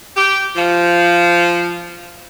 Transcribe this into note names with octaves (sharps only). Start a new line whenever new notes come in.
G4
F3